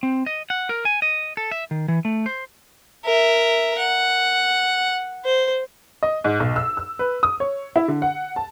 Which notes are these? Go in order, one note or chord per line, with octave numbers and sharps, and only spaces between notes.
C4
D#5
F#5
A#4
G#5
D#5
A4
E5
D#3
E3
A3
C5
A#4 E5
F#5
C5
D#5
G#2
B1
E6
E6
B4
D#6
C#5
E4
D3
F#5
A5